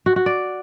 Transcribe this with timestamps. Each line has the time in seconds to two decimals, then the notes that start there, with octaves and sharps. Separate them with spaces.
0.06 F#4
0.16 F#4
0.26 D5